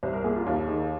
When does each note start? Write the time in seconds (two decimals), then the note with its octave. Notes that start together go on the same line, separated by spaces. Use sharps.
0.03 C2 C5
0.13 A#4
0.24 A#2 G#4
0.36 F4
0.46 D#2 F4
0.67 D#3 G#4